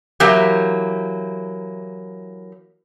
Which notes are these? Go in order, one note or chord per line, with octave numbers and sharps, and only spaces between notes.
E3 F#3 A#3 G4